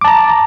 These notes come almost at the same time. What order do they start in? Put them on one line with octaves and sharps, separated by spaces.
D6 A5 A#5